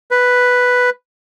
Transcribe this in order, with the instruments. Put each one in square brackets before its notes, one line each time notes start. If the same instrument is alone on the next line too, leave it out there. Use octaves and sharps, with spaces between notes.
[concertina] B4